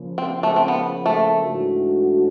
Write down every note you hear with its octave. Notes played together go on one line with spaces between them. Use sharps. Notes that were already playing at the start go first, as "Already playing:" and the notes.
Already playing: C#3 F3 A#3
C4
A3
C4
B3
A3
G#2 E3 A3 D4 F#4